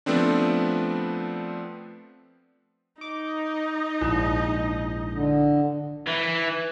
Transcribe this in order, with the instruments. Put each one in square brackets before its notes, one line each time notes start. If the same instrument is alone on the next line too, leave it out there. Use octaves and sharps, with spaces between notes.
[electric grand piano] F3 A3 B3 C4 D4
[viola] D#4 D#5 [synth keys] D6
[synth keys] A#1 G#2 [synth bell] E4
[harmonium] D3
[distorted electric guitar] E3